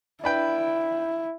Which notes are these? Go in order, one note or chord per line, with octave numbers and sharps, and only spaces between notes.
D4 E4 B4 G5